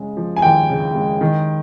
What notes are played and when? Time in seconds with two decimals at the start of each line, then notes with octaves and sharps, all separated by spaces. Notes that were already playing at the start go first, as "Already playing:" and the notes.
Already playing: C#3 G#3
0.17 F3
0.36 G#5
0.42 D#2 G5
0.69 C#3
0.95 G#3
1.21 D#3